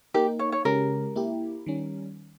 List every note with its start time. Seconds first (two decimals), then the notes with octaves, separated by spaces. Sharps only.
0.14 A#3 D#4 G4 A#4
0.39 C#5
0.52 C#5
0.65 C#3 G#3 C#4 G4 A#4
1.16 A#3 E4 G4
1.67 D#3 G3 C#4